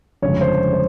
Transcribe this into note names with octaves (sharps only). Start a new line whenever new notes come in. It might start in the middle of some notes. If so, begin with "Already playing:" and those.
G1 F2 C#3 G#3 C#5
C5
C5